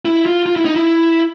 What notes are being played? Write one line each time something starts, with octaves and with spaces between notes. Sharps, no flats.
E4
F4
F4
E4
D#4
E4